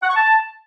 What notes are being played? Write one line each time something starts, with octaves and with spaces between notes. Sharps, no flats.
F#5
C#6
A5